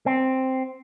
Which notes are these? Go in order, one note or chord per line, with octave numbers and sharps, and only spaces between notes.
C4